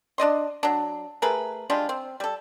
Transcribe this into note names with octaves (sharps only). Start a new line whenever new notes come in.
D4 D5 D#5 C6
F#3 D4
A3 G#4 A#4 B4
G3 G#3 D4 F4
C4
G3 A4